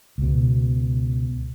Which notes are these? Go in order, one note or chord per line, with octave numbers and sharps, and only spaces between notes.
C#2 B2